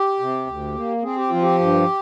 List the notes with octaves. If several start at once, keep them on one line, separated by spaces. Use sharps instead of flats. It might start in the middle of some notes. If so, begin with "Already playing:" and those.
Already playing: G4
C3
D2
A#3
C4 G#4
G4
F3 F4
G4
G2